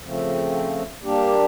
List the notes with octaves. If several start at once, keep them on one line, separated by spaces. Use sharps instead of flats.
C#3 F3 A3 C4
G3 A#3 D4 G4